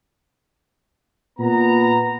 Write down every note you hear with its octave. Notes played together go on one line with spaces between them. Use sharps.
A#2 B3 A#5